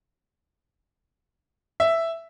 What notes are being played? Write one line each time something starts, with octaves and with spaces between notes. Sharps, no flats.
E5